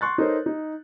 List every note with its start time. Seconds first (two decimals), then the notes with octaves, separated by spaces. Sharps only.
0.01 C6 C#6 F#6 A6
0.18 D#4 A4 A#4 C5 C#5
0.46 D#4